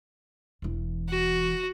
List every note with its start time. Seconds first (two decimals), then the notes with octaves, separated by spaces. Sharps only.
0.62 E1 E3
1.10 F#4